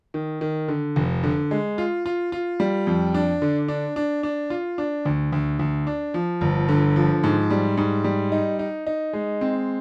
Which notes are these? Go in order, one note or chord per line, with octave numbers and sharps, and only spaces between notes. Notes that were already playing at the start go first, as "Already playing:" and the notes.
D#3
D#3
D3
F1
D3
G#3
F4
F4
F4
G3
F2
D4
D3
D4
D4
D4
F4
D4
D2
D2
D2
D4
F3
G1
D3
F3
G#2
G3
G#2
G3
D#4
D#4
D#4
G#3
C4